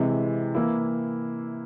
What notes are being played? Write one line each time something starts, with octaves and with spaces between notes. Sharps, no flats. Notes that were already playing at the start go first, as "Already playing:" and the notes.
Already playing: C3 E3 G#3
E3 A#3 E4